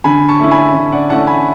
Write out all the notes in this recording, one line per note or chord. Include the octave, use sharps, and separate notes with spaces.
D3 G#5 B5
A5 C#6
A3 C#4 E4
G#5 B5
D3
D5 F#5
A3 C#4 E4 F#5 A5
G#5 B5